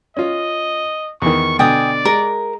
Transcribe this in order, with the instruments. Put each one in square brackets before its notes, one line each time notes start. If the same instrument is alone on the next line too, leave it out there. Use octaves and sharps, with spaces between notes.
[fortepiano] C#4 F4 [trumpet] D#5
[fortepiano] E2 D#3 [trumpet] C#6
[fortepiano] B2 D3 [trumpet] D5 [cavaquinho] G5 G#5 D#6
[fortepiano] G#3 [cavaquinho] A#4